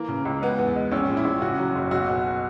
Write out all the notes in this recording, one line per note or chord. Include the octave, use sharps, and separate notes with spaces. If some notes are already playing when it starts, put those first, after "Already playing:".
Already playing: E3 A#3
C#3
C#2
G#3 B3
E2
G#3
A#1 C#4
A#2
E4
A#1
C#3 F#4
F#3
F#1
B1 F#4
B2